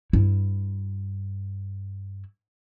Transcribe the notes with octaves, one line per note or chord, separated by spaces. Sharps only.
G2 E4